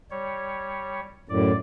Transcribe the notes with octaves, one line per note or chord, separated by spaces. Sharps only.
G3 C#5
F#2 A2 D5